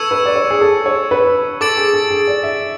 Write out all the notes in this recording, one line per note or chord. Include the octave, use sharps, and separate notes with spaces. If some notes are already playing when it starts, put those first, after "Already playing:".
Already playing: A4 B4 C#6 E6 G#6 C#7 E7
B4
D5
C#5
G#4
A4
C#5
B4
A4 D6 A6 D7 F#7
G#4
A4
G#4
D5
E5